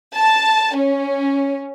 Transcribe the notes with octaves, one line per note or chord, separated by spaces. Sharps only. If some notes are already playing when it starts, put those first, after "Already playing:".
A5
C#4